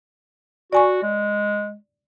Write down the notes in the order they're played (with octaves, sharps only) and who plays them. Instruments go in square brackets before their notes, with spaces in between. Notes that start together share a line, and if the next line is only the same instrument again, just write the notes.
[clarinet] F#4 [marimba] D5 G#5 C#6
[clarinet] G#3